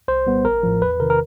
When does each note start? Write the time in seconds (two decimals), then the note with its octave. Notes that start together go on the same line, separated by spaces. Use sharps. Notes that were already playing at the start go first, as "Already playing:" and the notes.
0.08 C2 C5
0.26 A#2 G3 B3
0.45 A1 A#4
0.63 A2 F3
0.81 E2 B4
1.00 C3 D#3 A#4
1.10 A#4